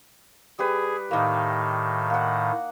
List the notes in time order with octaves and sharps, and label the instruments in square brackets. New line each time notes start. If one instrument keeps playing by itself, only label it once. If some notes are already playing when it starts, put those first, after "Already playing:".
[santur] G3 G4 B4 [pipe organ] G#4
[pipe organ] A2 D#3 [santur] A#3 D#4
[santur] A#3 F#5